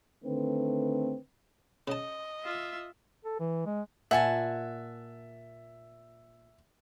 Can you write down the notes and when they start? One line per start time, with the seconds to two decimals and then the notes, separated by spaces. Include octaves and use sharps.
0.24 D3 D#3 A3 C4 B4
1.88 C#3 D#5 A5
2.44 F4 E5
3.25 A4
3.39 E3
3.66 G#3
4.11 A#2 E5 F#5 G#5 A5